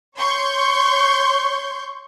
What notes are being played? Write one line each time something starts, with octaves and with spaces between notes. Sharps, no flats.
C#5 C6 C#6 G6